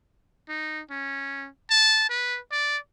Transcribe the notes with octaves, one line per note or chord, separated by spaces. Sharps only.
D#4
C#4
A5
B4
D5